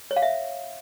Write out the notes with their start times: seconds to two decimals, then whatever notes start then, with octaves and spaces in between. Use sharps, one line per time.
0.11 C#5
0.17 F5
0.22 E5